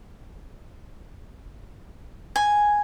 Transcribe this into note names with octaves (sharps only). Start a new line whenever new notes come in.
G#5